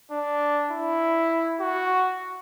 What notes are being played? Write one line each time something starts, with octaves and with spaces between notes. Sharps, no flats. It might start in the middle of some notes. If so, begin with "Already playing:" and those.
D4
E4
F#4